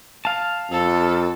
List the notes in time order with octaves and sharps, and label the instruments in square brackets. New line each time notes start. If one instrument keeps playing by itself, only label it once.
[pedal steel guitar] F5 A5
[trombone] F2 [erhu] A4